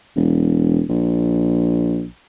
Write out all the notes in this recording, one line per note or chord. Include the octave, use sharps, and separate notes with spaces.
E1
A#1